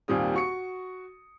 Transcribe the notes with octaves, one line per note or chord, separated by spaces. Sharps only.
D#2 A#2 G3 C4 G4 D#6
F#4 C#6 C#7